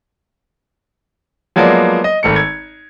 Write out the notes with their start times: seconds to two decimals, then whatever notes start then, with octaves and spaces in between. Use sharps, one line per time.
1.56 F3 F#3 G#3 A#3 B3 D5
2.04 D#5
2.23 G#1 A3 C#7
2.36 G#6